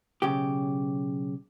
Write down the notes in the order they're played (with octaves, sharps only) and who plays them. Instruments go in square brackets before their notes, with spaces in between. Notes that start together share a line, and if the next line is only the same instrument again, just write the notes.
[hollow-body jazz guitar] B1 C#3 G4